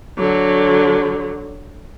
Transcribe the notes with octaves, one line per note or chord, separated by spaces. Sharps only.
D3 F#3